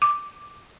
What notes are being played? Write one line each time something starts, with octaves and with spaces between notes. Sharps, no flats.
D6